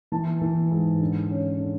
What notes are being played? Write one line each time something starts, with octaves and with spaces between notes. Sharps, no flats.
E3 A5
E3
G#2
D3
C#4
D3